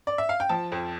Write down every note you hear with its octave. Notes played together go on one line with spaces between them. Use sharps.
D5
E5
F5
G5
F3 A5
F2